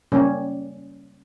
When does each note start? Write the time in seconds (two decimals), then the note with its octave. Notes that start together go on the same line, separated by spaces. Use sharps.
0.12 C#3 G3 A#3 C#4